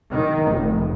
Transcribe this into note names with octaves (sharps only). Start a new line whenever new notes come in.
D#3
F1